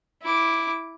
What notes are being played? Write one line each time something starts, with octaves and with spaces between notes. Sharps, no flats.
E4 D6